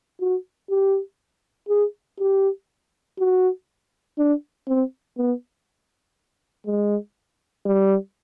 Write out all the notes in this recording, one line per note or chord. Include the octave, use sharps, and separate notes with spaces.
F#4
G4
G#4
G4
F#4
D4
C4
B3
G#3
G3